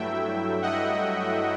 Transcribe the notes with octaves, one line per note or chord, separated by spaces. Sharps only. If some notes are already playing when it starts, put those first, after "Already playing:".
Already playing: G2 F#3 A3 E4 E5 G5
D#5 F#5